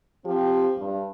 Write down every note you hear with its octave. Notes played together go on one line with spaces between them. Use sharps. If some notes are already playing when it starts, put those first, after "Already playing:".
F3 C4 G4
G2